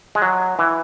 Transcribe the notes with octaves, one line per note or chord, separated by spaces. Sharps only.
G#3
F#3
E3